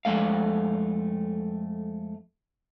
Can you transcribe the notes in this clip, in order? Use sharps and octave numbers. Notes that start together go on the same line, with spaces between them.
F2 G#3 A3 F5